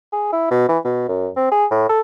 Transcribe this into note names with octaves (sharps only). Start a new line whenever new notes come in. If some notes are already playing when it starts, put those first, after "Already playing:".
G#4
E4
B2
E3
B2
F#2
C4
G#4
A2
A4